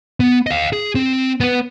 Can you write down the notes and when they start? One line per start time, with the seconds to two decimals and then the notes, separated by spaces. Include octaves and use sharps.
0.20 B3
0.47 D#5 F5
0.73 G#4
0.95 C4
1.40 B3 B4